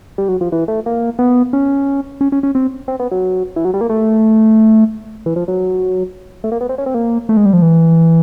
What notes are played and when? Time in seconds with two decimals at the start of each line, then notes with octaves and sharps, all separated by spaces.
0.18 G3
0.28 F#3
0.41 F3
0.52 E3
0.68 A3
0.86 A#3
1.19 B3
1.53 C#4
2.21 C#4
2.32 C#4
2.43 C#4
2.55 C4
2.88 C4
3.00 B3
3.11 F#3
3.56 E3
3.65 F#3
3.74 G3
3.81 A#3
3.89 A3
5.26 E3
5.36 F3
5.48 F#3
6.44 A3
6.52 A#3
6.61 B3
6.69 C4
6.78 C#4
6.86 C4
6.94 A#3
7.29 A3
7.37 G#3
7.45 G3
7.53 F3
7.62 E3